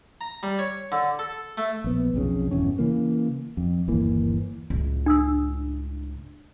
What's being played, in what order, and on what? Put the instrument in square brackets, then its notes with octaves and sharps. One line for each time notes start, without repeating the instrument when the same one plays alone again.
[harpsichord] A#5
G3
C#5
D3
A4
A3
[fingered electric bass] A#1 B3
B1 F2 C#3
G1 E2 B2 C#4
C#3 E3 A#3
F2
G1 D#2 E3 A#3
[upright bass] C#2 A2
[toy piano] D4 D#6 E6